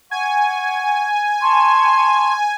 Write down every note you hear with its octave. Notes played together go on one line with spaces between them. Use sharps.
F#5 G#5 C#6
A5 C6 C#6